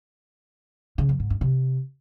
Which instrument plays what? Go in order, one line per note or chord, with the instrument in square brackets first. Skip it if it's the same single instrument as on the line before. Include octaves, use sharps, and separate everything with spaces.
[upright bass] C#3
F2
G#2
G2
C3